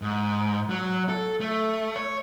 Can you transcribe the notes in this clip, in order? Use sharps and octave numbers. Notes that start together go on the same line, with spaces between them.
G#2
F#3
A4
A3
C#5